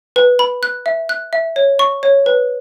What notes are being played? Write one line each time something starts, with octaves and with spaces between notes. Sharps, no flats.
B4
B5
F#6
E5
F#6
E5
C#5
C#6
C#5
B4